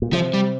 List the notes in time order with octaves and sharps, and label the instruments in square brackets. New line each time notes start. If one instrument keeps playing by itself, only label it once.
[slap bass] A#2
[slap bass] C3 [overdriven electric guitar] F3
[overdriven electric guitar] G3